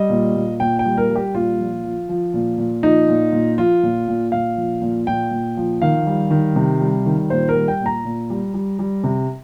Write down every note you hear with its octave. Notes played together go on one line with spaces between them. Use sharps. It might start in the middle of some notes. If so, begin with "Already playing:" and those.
Already playing: G3 D#5
A#2
A#2
A#2 G5
G5
G3
A#4
G3
G4
A#2 F4
F3
F3
F3
A#2
A#2
F3 D#4
A#2
A#2
F3 F4
A#2
A#2
A#2 F5
F3
A#2
A#2 G5
A#2
F3
D#3 F5
G3
D#3
C3
G3
D#3
A#2 C5
A#4
G3
G5
A#2
A#5
A#2
G3
G3
G3
C3